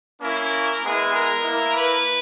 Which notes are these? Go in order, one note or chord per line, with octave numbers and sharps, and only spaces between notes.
A#3 C#4 E4 A#4
G#3 B3 E4 G#4
A#4
A#3 E4
B4